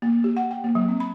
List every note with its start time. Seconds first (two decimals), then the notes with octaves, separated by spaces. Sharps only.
0.02 A#3
0.24 G4
0.37 F#5
0.51 G5
0.64 A#3
0.75 F#3
0.89 C4
1.00 B5